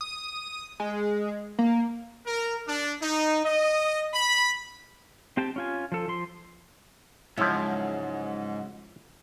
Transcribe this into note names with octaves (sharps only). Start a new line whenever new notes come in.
D#6
G#3
A#3
A#4
D4
D#4
D#5
B5
C4 G4 G5 A5
C#4 F4 G#5
F3 A4
F3 C6
G#2 C#3 F3 F#3 G#3 E4